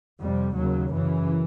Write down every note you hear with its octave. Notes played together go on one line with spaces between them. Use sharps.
F2 C3 G3
D#2 C#3 F#3
F#2 C#3 E3